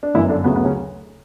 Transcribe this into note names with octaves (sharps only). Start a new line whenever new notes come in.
D4
G1 F#2 E3 E4
D3 D4
D2 C#3 F#3 B3
B3
C#3 C#4